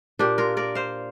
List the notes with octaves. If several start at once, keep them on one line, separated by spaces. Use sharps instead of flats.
A#2 A#3 D4 G4
F4 A#4
A#4 D5
C5 F5